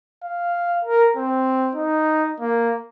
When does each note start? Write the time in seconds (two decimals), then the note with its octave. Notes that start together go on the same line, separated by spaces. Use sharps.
0.23 F5
0.85 A#4
1.17 C4
1.75 D#4
2.40 A#3